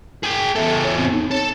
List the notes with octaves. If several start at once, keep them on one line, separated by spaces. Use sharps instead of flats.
G#4 G5
E2 A4 E5
C#5
C4
D#4
A4 C#5